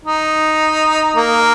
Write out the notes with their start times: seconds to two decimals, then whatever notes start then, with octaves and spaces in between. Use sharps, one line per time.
0.05 D#4
1.16 A#3